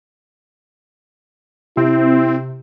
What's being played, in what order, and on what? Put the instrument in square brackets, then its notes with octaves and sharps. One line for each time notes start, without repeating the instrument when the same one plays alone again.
[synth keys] C3 [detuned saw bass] C4 [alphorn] E4